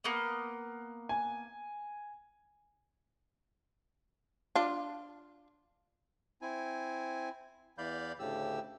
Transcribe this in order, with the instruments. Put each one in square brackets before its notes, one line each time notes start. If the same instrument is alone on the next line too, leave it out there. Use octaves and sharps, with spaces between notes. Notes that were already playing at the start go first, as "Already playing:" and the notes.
[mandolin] A#3 B3
[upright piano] G#5
[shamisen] D4 F4
[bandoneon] C4 E4 G#5
E2 E3 D5 F5 B5 G6
D2 A2 C#3 G4 E6